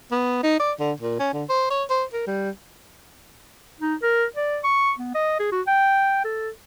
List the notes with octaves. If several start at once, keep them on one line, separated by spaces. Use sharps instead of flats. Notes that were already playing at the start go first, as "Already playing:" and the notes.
B3
D#4
D5
D3
A#2
C#4
D3
C5
C#5
C5
A#4
G3
D#4
A#4
D5
C#6
B3
D#5
G#4
F#4
G5
A4